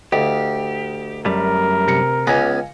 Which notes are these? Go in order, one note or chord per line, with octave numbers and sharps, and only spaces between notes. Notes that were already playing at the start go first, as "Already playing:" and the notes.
D2 G4 D#5 F5
F#2 G3 A3 A#4
C3 A#6 C#7
C#2 B3 C#4 F5 G#5 D6 A#6